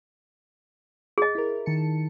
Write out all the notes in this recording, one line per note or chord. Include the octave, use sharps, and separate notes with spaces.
G#4 D#5
E4 A#4
D#3 A5 C#7